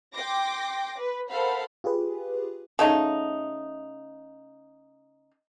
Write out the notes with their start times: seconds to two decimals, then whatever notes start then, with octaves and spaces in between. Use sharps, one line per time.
0.14 G5 C6 D6 A#6
0.99 B4
1.29 A4 A#4 C5 F5 F#5 B5
1.84 F4 G4 G#4 B4
2.79 C#3 A3 D#4